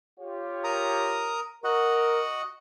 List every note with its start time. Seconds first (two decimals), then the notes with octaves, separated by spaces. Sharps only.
0.20 F4 G4 C#5
0.64 A#4 A#5 D#6
1.64 F#4 A#4 D#5 F#5